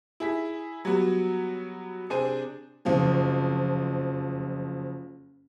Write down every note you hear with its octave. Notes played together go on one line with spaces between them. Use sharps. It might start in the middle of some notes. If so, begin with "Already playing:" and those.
E4 G#4 B6
F#3 G3 B3 F#4
C3 D4 G#4 C5 D#7
F#1 F2 F3